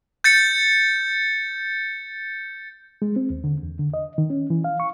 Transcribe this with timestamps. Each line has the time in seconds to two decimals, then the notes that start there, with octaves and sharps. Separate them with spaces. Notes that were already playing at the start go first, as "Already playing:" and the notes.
0.24 G6 A6 C#7
3.02 G#3
3.16 C4
3.30 D#2
3.44 D3
3.63 E2
3.79 D3
3.94 D#5
4.18 D#3
4.30 C#4
4.50 E3
4.64 F5
4.80 C#6